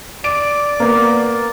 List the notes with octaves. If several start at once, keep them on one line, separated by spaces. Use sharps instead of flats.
D5 D7
A#3 B3